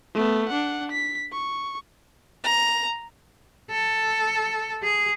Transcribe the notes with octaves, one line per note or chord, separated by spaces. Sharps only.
A3 B3
D4 F#5
B6
C#6
A#5
A4
G#4